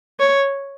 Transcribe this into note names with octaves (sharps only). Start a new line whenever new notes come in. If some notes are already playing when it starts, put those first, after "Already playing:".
C#5